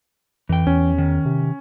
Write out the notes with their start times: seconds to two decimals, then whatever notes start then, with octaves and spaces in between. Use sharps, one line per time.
0.49 F2 E3 G5
0.67 E2 C#4
0.98 D#3
1.25 C3